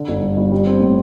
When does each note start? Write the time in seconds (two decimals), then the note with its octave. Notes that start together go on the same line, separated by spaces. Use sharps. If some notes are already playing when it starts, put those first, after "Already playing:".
Already playing: D3
0.08 G1
0.22 G2
0.37 G1
0.52 G3
0.67 C4
0.81 A2